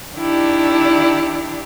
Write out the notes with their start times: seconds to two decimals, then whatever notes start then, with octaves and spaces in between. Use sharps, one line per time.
0.16 D#3 D4 E4 G4 D5